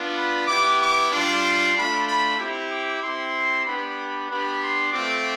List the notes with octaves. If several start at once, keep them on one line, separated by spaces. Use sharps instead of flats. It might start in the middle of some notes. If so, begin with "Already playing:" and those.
Already playing: B3 D4 F4
B5
B3 E4 G4 D6
D6
G3 D4 F4 C6
A3 D4 F4 B5
B5
C4 E4 G4
D6
C4 E4 G4 C6
B3 D4 G4 B5
B3 D4 G4 B5
C6
A3 C4 F4 D6